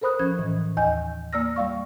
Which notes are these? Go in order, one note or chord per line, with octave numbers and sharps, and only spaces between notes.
A4 A#4 C5 B5 D#6 F#6
F3 C#4 G#6
A2 D#3 E3
D#2 D#5 G#5 G6
A#3 D5 E6 F6 A#6
G3 D5 F5 C#6